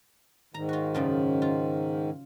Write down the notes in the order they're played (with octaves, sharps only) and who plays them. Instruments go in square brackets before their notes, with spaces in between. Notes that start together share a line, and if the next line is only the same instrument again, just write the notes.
[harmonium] G#2 D#3 [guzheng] A#5
[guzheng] F4 F#4
F#2 C#3 F4
F4